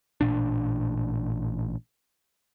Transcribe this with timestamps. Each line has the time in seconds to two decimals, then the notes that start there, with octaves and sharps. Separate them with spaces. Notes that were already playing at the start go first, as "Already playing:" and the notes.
0.21 A1 A#2 D4